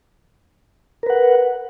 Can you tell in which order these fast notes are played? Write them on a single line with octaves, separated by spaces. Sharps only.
A#4 B4 F#5